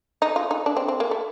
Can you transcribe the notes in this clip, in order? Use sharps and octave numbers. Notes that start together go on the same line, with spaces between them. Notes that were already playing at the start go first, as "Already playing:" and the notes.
D#4
F4
D#4
D4
C4
C4
A#3
A3